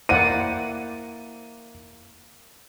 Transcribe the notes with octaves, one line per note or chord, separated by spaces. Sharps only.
A#3 E4 C5 D5 F#5 D#7